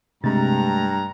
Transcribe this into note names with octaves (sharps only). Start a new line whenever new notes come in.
G2 C3 G#3 A3 A#5 A6